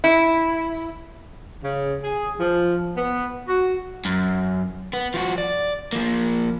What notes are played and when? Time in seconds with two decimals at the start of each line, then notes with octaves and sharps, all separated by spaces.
0.04 E4
1.64 C#3
2.03 G#4
2.39 F3
2.96 B3
3.48 F#4
4.05 F#2
4.93 B3
5.14 F3 F#4
5.38 D5
5.93 F3 A#3